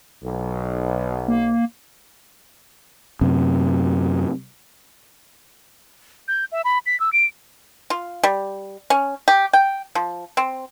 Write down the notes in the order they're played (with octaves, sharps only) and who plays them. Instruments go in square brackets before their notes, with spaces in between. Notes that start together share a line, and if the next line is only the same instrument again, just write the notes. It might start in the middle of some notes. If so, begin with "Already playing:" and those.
[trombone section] B1
[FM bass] A#3
[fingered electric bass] F#2 C3
[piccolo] G6
E5
B5
B6
E6
D7
[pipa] F4
G3
C#4
G4
G5
F3
C4